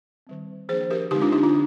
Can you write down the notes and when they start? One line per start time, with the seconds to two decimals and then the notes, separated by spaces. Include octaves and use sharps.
0.27 D#3 G3 C4
0.69 F3 A#3 D4 G#4 C5
0.91 G4 A#4
1.11 D3 G#3 C4 D#4 G4
1.21 D4 F4
1.32 D#4 G4
1.43 D4 F4